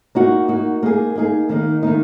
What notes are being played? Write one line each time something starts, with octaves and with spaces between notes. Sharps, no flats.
A#3 D#4 F#4
A#3 D#4 F#4
A#3 D#4 G#4
A#3 D#4 G#4
D#3 A#3 D#4
D#3 A#3 D#4